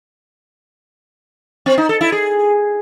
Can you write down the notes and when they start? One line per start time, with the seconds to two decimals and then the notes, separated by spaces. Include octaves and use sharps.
1.66 C4
1.78 D#4
1.89 A4
2.01 E4
2.12 G#4